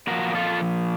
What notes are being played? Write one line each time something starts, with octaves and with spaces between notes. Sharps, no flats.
A#2 F3 F#4 A#4
A#4
F4 A4